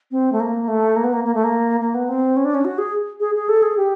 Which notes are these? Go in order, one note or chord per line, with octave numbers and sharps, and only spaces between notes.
C4
A3
A#3
A3
A#3
B3
A#3
A#3
A3
A#3
A#3
B3
C4
C#4
D4
C#4
F#4
G#4
G#4
G#4
A4
G#4
G4